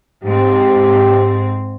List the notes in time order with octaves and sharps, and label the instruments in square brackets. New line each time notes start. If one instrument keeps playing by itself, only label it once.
[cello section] G#2 C4 [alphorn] G4